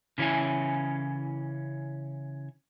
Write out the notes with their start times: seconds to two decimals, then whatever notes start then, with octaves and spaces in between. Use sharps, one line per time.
0.18 C#3 E3 C#4 E4 G#5